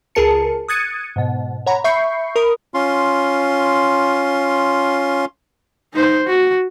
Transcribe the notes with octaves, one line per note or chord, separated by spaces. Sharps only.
C#2 G#4 A#4 A5 C#7
D#6 F#6 G#6 A6 C#7 D#7
G#2 B2
C#5 F#5 A#5 B5
E5 B5 C#6 G6 C7 C#7
A#4 B5 D#6
C#4 F4 C6
D#4 C5
F#4